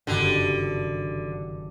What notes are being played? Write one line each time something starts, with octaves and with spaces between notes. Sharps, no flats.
F#1 G2 D3 D#3